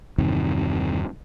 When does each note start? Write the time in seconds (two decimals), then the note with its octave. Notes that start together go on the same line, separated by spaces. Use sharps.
0.18 E2 G2 C3 D#3